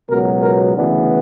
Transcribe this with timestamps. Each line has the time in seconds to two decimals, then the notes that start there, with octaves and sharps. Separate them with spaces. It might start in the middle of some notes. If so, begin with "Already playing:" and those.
0.10 C#2 B2 F#3 B3 A#4
0.43 A#4
0.76 D2 C#3 E3 B3 D4